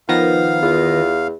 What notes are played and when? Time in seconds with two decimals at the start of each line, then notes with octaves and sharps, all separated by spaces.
0.09 D#3 F3 B3 F5 A#6
0.63 E2 F4